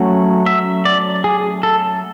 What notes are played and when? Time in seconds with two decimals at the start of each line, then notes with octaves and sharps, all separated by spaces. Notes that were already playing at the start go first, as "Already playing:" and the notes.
Already playing: F#3 A3 C#4
0.46 E5
0.85 D5
1.24 G#4
1.63 A4